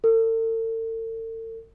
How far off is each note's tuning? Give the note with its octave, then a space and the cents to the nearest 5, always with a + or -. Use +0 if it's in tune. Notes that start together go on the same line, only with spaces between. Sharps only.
A4 +45